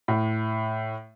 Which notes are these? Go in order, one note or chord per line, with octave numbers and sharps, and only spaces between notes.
A2